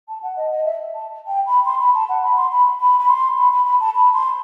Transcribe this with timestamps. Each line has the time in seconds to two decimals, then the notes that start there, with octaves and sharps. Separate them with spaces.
0.08 A5
0.23 F#5
0.36 D#5
0.51 D#5
0.65 E5
0.94 A5
1.27 G5
1.46 B5
1.65 C6
1.81 B5
1.95 A5
2.09 F#5
2.23 B5
2.37 C6
2.52 B5
2.80 B5
2.99 B5
3.09 C6
3.38 B5
3.52 B5
3.66 B5
3.80 A5
3.95 B5
4.14 C6